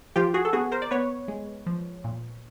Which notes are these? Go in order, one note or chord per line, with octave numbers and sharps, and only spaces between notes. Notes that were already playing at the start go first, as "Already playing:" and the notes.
F3 F4 G4
F#4 G#4
A4
B3 F#4 G#4
A#4 C5
D5
B3 B4 C#5
G#3
F3
A#2